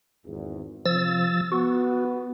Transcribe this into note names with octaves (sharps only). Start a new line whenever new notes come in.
G#1 E2
C3 F3 F4 E6 A6
B3 F#4